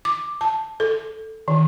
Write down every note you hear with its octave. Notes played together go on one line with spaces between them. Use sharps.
D6
A5
A4
D#3